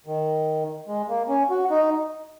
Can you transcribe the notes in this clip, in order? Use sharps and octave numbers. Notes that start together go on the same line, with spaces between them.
D#3
G#3
A#3
C#4
F#4
D#4